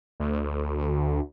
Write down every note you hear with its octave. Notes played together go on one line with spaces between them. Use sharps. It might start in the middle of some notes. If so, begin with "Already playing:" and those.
D2